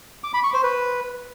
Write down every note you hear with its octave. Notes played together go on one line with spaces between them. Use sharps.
D6
B5
C#6
C5
B4